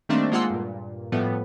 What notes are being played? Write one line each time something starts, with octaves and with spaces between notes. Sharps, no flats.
D#3 G3 A3 A#3 C4 D4
G#3 A#3 F4 F#5 C6 E6
G2 A#2
A2 F3 G3 A3 B3